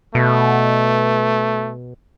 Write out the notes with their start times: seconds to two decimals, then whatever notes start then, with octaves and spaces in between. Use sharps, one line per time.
0.15 B2 A3